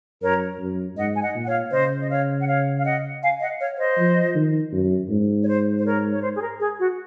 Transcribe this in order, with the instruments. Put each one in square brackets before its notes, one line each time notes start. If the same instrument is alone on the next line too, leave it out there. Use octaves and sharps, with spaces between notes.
[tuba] F#2 [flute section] A#4 C#5
[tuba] F#2
[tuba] G#2 [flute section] D#5 F#5
[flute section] G#5
D#5 F#5
[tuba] A#2
[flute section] F#5
C#5 F5
[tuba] C#3 [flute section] C5 D#5
[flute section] D#5
C#5 F5
F#5
C#5 F5
F5
D#5 F#5
F5 G#5
D#5 F#5
C#5 F5
C5 D#5
[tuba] F3
D#3
F#2
G#2
[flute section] C#5
C5
C5
A#4 C#5
C#5
C5
G#4
A#4
G#4
F#4